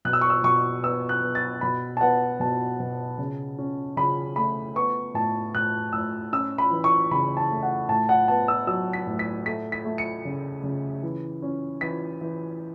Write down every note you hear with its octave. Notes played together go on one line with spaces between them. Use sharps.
B2 F#6
E6
C#6
E6
B2 C#6
B3 E6
F#6
B3
A6
B2 B5
A5
B3 F#5
B2 A5
B2
C#3
C#4
C#3 B5
A3 B5
B3 C#6
A2 A5
A2 F#6
A2 E6
C#4 E6
B5
E3
C#6
C#3 B5
A5
A3
F#5
A2 A5
F#5
B3 A5
E6
F#3 E6
B6
A2
B6
A3 B6
B6
A3
C#7
C#3
C#3
E3
C#4
E3 B6
E3